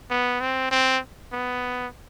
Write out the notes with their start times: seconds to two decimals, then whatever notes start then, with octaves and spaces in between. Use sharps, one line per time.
0.11 B3
0.41 C4
0.71 C4
1.32 B3